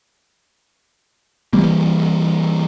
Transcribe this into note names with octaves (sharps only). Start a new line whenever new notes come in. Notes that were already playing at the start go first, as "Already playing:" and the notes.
E3 G3 A#3